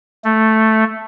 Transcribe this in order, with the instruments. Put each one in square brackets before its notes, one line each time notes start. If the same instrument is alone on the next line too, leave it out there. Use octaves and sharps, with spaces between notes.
[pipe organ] A3